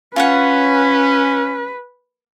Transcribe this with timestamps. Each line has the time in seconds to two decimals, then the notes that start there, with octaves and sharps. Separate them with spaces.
0.16 C#4 F4 B4 C#5 F#5